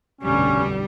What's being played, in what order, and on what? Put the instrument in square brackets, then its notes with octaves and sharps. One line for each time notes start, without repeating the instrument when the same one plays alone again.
[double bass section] F1 B1 D3 [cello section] G2 G3 [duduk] C#4